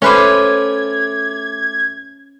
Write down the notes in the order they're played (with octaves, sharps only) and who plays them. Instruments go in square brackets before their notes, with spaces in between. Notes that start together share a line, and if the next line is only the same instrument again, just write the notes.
[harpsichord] A3 G4 [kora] C#4 B4 C5 [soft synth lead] G#6